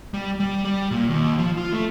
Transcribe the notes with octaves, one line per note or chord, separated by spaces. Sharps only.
G3
G3
G3
A#2
D#2
F3
F4
A3